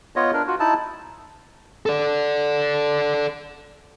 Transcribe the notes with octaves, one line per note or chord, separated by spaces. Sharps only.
B3 F4 C#5 D#5
D4 A#4
F4 F#4
D#4 E4 A5
A4 D5